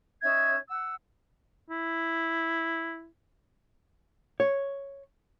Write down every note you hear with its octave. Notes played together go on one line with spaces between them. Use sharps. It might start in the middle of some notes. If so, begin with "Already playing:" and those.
C#4 D#4 E5 G#6
F#5 E6
E4
C#5